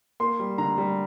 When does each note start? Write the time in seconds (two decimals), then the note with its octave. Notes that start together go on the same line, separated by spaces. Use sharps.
0.20 A#3 C6
0.39 G3
0.58 D3 A#5
0.78 G3